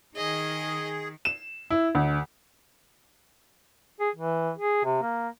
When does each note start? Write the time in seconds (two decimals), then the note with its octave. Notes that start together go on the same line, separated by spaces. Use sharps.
0.16 D#3 G#4 D#5
1.25 E7
1.70 E4
1.95 D2
4.00 G#4
4.16 E3
4.58 G#4
4.85 C3
5.02 A#3